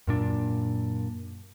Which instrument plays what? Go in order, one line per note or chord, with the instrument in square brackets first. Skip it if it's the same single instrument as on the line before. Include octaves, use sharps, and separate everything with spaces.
[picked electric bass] F#2 A#2 D4